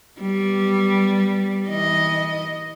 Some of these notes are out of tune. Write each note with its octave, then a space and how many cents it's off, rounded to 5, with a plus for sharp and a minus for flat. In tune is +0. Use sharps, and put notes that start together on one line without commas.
G3 -5 B3 +0
E3 -35 D#5 +0